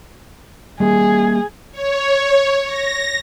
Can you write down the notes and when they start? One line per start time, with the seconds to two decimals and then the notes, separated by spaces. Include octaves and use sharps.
0.80 G3 A#3 G#4
1.72 C#5
2.65 A#6